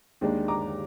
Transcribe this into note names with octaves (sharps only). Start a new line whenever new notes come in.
D#2 D#3 G#3 D4
A#5 D6